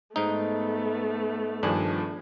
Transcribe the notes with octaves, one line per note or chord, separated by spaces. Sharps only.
G#2 A3 B3 D#4
G2 D#3 F3 D4 G#4